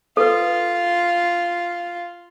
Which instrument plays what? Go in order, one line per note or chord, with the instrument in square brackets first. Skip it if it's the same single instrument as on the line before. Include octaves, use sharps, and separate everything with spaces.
[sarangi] F4 [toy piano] A4 B4